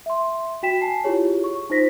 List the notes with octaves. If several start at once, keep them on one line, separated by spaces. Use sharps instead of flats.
E5 C6
F#4 G5 B6 E7
G#5 A5 C7
E4 F4 G4 G#4 C#5
C#6
D#4 F4 C5 A#6 B6